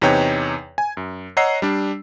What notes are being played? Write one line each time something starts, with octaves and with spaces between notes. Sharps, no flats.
E2 C3 D#4 B4 C#5 G5
G#5
F#2
C#5 D#5 F#5 A#5 E6 C7
G3 D4